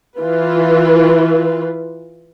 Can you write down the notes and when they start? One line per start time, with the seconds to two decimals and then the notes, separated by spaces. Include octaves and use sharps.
0.18 E3 F4 B4